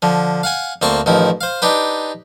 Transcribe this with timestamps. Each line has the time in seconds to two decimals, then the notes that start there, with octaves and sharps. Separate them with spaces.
0.02 D3 F3
0.43 F5 F#5 G#5
0.82 D2 A#3 C4 A5 C6 C#6
1.06 A1 D#3 F3 E4
1.41 C5 F5
1.62 D4 D#4 G4 B4